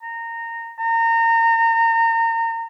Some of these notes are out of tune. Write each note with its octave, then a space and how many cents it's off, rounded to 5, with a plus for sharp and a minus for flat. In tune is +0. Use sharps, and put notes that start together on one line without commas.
A#5 -15
A#5 -30